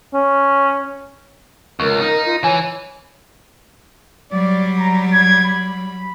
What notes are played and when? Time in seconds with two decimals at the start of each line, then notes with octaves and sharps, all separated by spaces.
0.13 C#4
1.80 C#2 A#4 C#6
2.01 D#4
2.26 F4
2.44 E3 C#5 G#5
4.32 F#3 G3 D5
4.79 A#5
5.13 G#6
5.45 B5